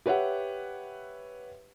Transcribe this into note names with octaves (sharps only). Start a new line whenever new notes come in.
G4 B4 C#5 E5 F#5